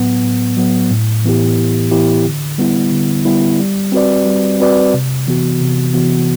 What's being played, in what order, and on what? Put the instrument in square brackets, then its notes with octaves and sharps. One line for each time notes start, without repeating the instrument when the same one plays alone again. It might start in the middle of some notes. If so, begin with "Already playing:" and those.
Already playing: [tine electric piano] A2 F#3 B3
A2
F#3 B3
A2
E3 B3 E4 G4
A2
E3 B3 E4 G4
D3
G3 B3 E4
D3
G3 B3 E4
G3
C4 F#4 B4 D5
G3
C4 F#4 B4 D5
C3
E3 B3 F#4
C3
E3 B3 F#4